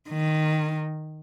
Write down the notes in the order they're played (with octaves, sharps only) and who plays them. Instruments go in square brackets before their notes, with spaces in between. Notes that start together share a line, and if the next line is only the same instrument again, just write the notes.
[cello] D#3